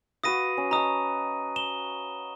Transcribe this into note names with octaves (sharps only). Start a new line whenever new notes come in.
F#4 B4 F5 D#6 A#6 D#7
C#4
D#5 A5 A#5 D#6
E7 G7